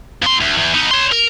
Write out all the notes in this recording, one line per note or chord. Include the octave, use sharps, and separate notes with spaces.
F2 C6
D2
E2
B3 D#4
C#5 C6
A#4